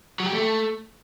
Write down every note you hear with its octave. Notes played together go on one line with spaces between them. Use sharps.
F#3
G4
A3